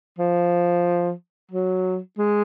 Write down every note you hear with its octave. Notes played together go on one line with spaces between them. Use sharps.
F3
F#3
G#3